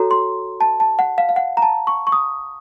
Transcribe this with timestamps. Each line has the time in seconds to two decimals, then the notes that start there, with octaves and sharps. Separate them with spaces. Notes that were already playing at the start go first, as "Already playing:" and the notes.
Already playing: F#4 A4 C#5 A#5
0.11 C6
0.61 A5
0.80 A5
0.99 F#5
1.18 F5
1.29 F5
1.36 F#5
1.57 A#5
1.62 A5
1.87 C#6
2.07 C#6
2.12 D#6